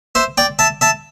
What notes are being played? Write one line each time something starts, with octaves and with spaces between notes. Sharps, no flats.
C5 E5
D5 G5
E5 A5
E5 A5